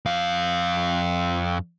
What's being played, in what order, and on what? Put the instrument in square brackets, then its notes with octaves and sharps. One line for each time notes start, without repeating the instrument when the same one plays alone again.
[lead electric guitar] F2 F5